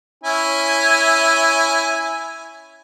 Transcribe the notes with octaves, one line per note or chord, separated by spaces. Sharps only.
C#4 E4 G#5